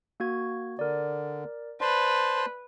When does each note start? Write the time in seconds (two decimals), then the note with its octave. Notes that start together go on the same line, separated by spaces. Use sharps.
0.20 A#3 F#4 G#6
0.79 D3 A#4 D5
1.81 B4 C5 D5 A5 C6